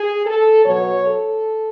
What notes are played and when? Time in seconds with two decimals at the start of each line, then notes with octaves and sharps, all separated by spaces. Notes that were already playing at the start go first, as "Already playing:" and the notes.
Already playing: G#4
0.25 A4
0.65 B2 F#3 C#5
1.05 A4